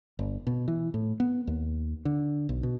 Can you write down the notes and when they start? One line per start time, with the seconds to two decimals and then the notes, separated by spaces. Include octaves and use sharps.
0.19 G1
0.47 B2
0.68 E3
0.94 A2
1.20 B3
1.47 D#2
2.05 D3
2.49 B1
2.63 B2